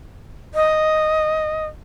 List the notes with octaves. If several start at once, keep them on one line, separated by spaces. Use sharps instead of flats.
D#5